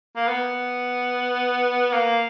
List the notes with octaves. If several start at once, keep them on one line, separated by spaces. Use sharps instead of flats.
A#3
B3
A#3